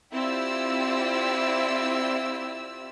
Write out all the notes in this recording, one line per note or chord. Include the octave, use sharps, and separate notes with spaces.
C4 E4 F4 G4 D5 E6